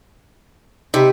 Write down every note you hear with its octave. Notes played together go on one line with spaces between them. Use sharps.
C3 D#4 G4 B5